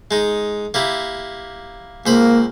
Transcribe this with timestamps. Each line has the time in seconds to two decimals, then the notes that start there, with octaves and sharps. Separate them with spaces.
0.11 G#3 D#4
0.74 A#3 E4 G4
2.06 C#2 A#3 C5 B5